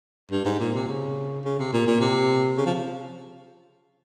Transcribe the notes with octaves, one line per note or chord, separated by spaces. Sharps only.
G2
G#2
A#2
C3
C#3
C#3
C3
A#2
A#2
C3
C#3
F3